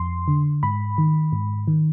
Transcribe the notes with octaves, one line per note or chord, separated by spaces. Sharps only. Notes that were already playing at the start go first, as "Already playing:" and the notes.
Already playing: F2 C6
D3
G#2 B5
D#3
G#2
D#3